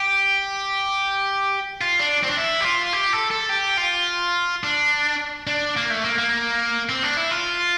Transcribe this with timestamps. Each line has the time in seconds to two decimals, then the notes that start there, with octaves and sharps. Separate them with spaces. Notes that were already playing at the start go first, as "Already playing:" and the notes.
Already playing: G4
1.81 F4
2.00 D4
2.24 C4
2.30 D4
2.37 E4
2.61 G4
2.65 F4
2.93 G4
3.13 A4
3.31 A4
3.49 G4
3.78 F4
4.63 D4
5.47 D4
5.76 A#3
5.90 A3
6.05 A#3
6.18 A#3
6.89 C4
7.03 D4
7.17 E4
7.31 F4